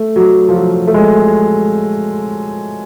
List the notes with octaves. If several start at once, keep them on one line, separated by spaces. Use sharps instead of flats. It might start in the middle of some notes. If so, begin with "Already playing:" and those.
Already playing: A3
F#3
F3
F#3
A3
G#3